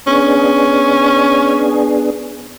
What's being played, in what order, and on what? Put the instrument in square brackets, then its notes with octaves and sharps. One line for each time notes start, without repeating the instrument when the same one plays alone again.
[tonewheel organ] B3 D4 G#4 [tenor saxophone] C#4